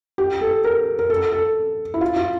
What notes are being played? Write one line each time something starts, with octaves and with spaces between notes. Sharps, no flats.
G4
A4
A#4
A#4
A4
A4
E4
F4
F4